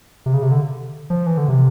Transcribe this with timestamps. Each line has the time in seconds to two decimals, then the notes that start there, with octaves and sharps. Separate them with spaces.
0.26 C3
0.34 C#3
0.43 C3
0.51 D3
1.10 F3
1.26 E3
1.38 D3
1.49 C3